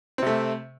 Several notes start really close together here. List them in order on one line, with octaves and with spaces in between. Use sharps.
C4 C3 A3